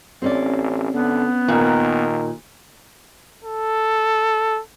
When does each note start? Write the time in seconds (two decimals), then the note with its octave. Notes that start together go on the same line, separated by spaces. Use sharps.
0.22 A1 C4 C#4 D5
0.94 D3 B3
1.48 A#2 D#3
3.45 A4